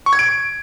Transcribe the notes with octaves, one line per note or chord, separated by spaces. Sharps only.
C#6
G#6
D7